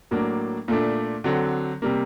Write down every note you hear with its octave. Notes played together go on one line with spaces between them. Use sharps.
A2 F#3 A#3 D4
A#2 A3 D4
D3 F#3 C4
C3 G3 A#3